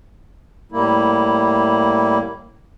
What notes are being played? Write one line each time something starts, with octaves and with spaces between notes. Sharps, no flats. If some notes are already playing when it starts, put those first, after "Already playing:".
A2 G3 A#3 E4